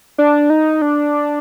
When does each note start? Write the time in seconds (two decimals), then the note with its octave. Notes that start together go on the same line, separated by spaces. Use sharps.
0.18 D4
0.50 D#4
0.82 D4